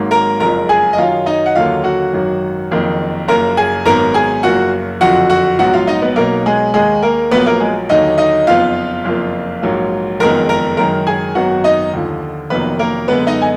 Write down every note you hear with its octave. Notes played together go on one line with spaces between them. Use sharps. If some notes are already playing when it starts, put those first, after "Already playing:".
Already playing: G#1 G#2 F#3 A#3
A#4 A#5
F#1 F2 F3 G#3 A#4 A#5
G#4 G#5
D#5
F#2 D#3 F#3 F4 F5
D#4 D#5
F#5
D#2 D3 F#3 A#3 F4 F5
F#4 F#5
G#1 F#2 D#3 F#3
F#1 F2 D#3 A#3
F#1 F#2 F3 A#3 A#4 A#5
G#4 G#5
G#1 G#2 F#3 B3 A#4 A#5
G#4 G#5
F#1 F#2 F3 A#3 F#4 F#5
F#1 F2 D3 F3 F#4 F#5
F#4 F#5
A#1 G#2 F#3 B3 F#4 F#5
F4 F5
D#4 D#5
B3 B4
B1 B2 F#3 A#3 B3 A#4
G#3 G#4
D#2 D#3 G#3 G#4
A#3 A#4
A#1 A#2 F#3 A#3 B3 B4
A#3 A#4
G#3 G#4
D#2 D3 F#3 D#4 D#5
D#4 D#5
F#1 F2 F3 B3 F4 F5
F#1 F2 F3 A#3
A#1 G#2 F#3 A#3
F#1 F2 D#3 G#3 B3 A#4 A#5
A#4 A#5
F#1 F#2 D#3 G#3 A#4 A#5
G#4 G#5
G#1 F#2 D#3 F#3 B3 F#4 F#5
D#4 D#5
D#2 D3 F3
F1 F2 D#3 F#3 A#3 B3 B4
A#3 A#4
F#2 D3 G#3 B3 B4
D#4 D#5
G#5